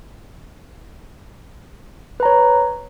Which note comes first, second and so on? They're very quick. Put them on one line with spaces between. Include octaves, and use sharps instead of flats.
B4 A#5 C#5